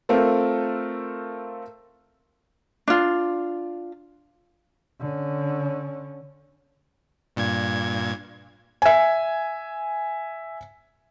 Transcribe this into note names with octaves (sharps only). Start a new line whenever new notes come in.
A3 C4 F4 A4 A#4
D4 F4
D3 C#4
G2 A#2 G#6
E5 G#5